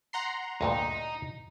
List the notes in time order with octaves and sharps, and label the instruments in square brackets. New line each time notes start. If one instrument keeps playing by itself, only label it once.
[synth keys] F#5 A#5 C6
[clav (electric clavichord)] D2 G2 A#2 [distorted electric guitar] D#4